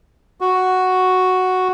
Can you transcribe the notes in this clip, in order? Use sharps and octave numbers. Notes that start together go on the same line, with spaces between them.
F#4